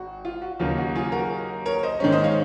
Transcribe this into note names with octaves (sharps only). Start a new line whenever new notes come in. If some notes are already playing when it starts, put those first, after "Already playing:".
Already playing: G#1 F#4
F4
F#4
D#2 C#3 F#3 A#3 F4
F#4
F4 G#4
F#4 A#4
A#4 C#5
C5 D#5
G#2 D#3 G#3 C#4
C5 D#5
C#5 F5